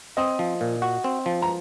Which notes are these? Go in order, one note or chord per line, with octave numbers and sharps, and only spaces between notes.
C4 D#5 D#6
F3
A#2
F#4
C4
F3
A#5